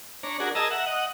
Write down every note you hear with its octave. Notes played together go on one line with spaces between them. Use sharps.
D4 C#5 A#5
D4 F#4 G#4 A#4
G#4 A#4 D#5 A5 A#5 E6
E5 F#5 A#5
D#5 F#5